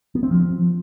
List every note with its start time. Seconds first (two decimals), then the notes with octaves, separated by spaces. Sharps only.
0.15 B3
0.23 C4
0.31 F3